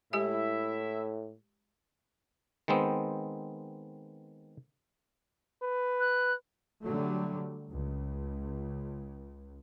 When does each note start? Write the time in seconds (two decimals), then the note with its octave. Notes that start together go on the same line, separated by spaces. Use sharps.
0.13 A2 G#3 E4 G4 E5 G#5
2.68 D#3 G#3 B3 C4
5.62 B4
6.00 F#6
6.83 D3 F#3 G3 A3
7.70 C#2